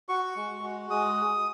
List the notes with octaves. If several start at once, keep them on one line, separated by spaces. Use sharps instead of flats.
F#4 C#6
G#3
F#4
G#3 D#6